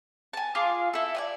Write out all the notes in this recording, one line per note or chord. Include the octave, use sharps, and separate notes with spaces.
G#5 A5
F4 G#4 F5 D6
E4 A4
D5 D#5 G#5